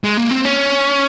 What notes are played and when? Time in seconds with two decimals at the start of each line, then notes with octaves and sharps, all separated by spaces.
0.04 G#3
0.17 A#3
0.30 C4
0.45 C#4